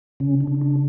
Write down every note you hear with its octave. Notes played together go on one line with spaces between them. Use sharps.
C#3 C#4
D4
C#3
D4